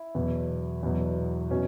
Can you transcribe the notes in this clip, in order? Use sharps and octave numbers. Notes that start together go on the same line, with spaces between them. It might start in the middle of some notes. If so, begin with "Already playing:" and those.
Already playing: E4
E2 B2 F#3
E2 B2 F#3
B2 F#3 C#4